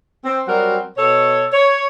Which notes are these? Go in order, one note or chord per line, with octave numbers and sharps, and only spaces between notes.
C4
F#3 G3 C4 F#4 A#4
B2 A4 C#5
C#5